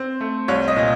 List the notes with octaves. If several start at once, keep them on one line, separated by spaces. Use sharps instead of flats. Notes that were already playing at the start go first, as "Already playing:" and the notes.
Already playing: C4 C5
A3
C2 C#5
D#5
A#2